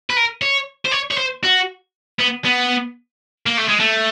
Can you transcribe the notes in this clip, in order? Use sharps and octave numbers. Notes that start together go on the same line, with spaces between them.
B4
A#4
C#5
C5
C#5
C#5
C5
F#4
B3
B3
A#3
A3
G#3
A3